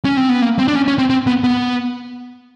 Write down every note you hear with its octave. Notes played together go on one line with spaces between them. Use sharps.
C#4
C4
B3
A#3
C4
D4
C#4
C#4
C4
C4
B3
B3